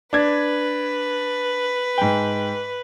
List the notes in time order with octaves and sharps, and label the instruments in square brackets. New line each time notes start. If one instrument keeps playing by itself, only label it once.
[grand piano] D4 G#6 [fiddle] B4
[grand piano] G#2 G5